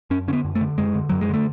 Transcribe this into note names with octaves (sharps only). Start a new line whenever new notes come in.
F#2 C#4
D3 C#4
B3
F#2
A3
D3
F#2 G#3
D3
F#2 F#3
G#3
D3 A3